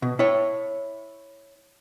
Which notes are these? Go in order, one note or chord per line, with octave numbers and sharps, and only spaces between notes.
B2
E4 C#5